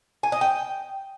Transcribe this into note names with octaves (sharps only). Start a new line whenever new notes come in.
G#5
D#5
G5